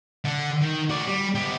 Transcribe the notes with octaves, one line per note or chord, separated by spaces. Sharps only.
D3
D#3
F#4 D5
G3
B3 G4